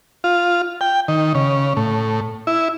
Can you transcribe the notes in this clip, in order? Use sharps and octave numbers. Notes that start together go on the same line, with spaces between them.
F4
G5
D#3
C#3
A2
E4